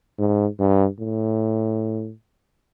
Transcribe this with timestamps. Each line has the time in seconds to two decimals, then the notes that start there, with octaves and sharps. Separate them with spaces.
0.19 G#2
0.59 G2
1.00 A2